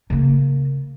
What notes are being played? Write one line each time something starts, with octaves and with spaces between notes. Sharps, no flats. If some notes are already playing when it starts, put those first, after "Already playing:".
C#3 A#3